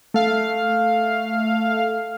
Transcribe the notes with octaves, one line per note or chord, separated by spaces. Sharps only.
A3 F5